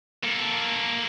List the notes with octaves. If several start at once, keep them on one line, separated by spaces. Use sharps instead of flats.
A#3 A4